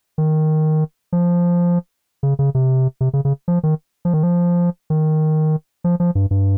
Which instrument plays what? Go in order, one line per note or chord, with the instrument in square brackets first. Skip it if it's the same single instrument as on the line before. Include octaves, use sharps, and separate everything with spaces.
[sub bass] D#3
F3
C#3
C#3
C3
C3
C#3
C#3
F3
D#3
F3
D#3
F3
D#3
F3
F3
G2
G2